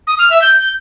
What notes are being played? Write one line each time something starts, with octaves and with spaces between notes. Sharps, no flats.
D#6
F6
E5
G6